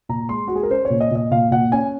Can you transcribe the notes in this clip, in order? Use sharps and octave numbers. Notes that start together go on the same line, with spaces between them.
A#2 A#5
G#3 C6
G#3 F#4
G#4
A#4
C#4 C5
C#5
A#2
D#5
A#2 D#5
A#2 F5
A#2 F#5
C#4 G#5